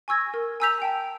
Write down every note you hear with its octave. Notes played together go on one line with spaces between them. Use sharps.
G#5 C#6 E6 G#6 A#6
A#4
G#5 A#5 E6 G6 B6 F7
G5 A5